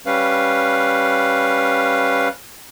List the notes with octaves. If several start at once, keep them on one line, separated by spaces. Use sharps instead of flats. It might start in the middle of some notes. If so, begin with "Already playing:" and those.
G3 C#4 B4 F5